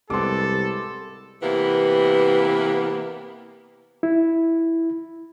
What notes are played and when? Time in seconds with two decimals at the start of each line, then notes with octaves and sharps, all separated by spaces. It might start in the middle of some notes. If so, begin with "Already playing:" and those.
0.10 C2 G#3 B3 C4 A4 C6 D6
1.43 C3 E3 A#3 B3
4.03 E4